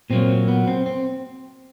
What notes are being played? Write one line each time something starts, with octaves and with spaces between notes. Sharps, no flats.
A#2 F#3 A#3 C4
B3
C4
C4